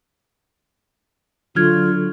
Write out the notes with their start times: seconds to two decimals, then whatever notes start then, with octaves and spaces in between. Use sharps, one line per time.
1.56 D3 F#3 F4 F6 G#6